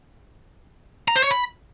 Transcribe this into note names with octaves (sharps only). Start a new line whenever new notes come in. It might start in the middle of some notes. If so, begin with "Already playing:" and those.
A#5
C5
C#5
B5